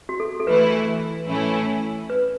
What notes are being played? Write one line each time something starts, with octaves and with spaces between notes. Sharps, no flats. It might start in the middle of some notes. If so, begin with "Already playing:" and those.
F#4
A4
A4
E3 A3 E4 B4
A2 E3 A3 C#4 E4
B4